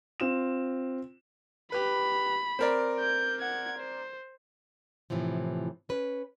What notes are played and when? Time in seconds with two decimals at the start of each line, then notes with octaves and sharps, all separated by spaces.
0.20 C4 F4 E7
1.72 G4 B4 B5
2.59 C4 A#4 D5
3.00 G6
3.40 F#5 G#6
3.78 C5
5.10 A2 C3 E3 F3
5.89 C#4 B4